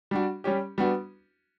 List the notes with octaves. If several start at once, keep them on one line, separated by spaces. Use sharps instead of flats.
G3 D4 F#4
G3 C#4 G4
G3 B3 D4 F#4